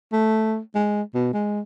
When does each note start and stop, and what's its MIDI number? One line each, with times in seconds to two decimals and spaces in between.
0.12 0.59 57
0.75 1.02 56
1.15 1.33 47
1.33 1.61 56